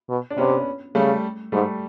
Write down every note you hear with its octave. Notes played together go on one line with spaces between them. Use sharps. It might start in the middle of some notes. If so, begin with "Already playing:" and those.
B2
D4
C3 B3 C#4
C#3 G3 A3
G#2 G3 A3